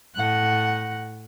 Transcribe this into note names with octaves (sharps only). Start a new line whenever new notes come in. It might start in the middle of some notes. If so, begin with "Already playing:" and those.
A2 F#5